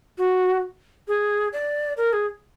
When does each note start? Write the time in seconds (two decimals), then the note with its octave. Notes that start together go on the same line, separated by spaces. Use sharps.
0.18 F#4
1.08 G#4
1.53 D5
1.97 A#4
2.13 G#4